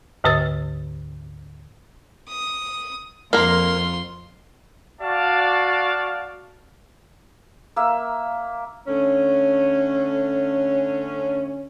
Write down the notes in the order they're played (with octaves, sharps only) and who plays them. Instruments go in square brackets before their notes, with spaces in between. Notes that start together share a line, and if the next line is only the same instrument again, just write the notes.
[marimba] D2 G#2 D3 B4 E6 A6
[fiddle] D#6
[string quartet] F2 [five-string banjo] A#3 A#4 [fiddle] F4 C6
[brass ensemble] F#4 D5 F5 A5
[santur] A#3 E5
[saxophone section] D3 A3 C#4